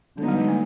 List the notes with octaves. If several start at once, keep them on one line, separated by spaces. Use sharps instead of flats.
D3 F#3 G#3 B3 D#4
G3
G#3
A#3